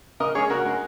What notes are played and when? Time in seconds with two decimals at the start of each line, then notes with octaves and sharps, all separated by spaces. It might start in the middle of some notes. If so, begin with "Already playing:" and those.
0.20 C#3 A#4 D#5
0.35 G#3 C#4 G#4 C#5
0.50 C#3 F#4 A#4
0.65 G#3 C#4